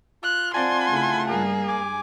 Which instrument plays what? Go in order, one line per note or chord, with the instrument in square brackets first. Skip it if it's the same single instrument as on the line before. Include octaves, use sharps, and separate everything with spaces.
[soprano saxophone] F4 [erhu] F#6
[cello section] C4 D5 [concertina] F4 F#5 A5 [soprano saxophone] G#5 [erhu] C6
[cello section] C#3 A3 E4
[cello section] G2 G3 [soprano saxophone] A#3 [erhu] G#4
[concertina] G#5 D6